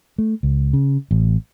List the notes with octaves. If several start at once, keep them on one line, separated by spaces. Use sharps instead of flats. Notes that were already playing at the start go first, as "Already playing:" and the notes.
A3
C#2
C#3
A1